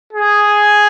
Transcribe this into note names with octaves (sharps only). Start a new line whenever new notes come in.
G#4